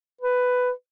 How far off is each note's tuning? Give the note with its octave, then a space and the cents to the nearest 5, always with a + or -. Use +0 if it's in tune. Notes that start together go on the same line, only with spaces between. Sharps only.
B4 +10